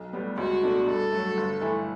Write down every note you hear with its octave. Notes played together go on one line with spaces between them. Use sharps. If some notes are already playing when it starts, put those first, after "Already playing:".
Already playing: B1
A2 G3 B3
C#2 F#4
B2 A3 D4
G2 A4
F#3 A3
G1
G2 E3 A3 E4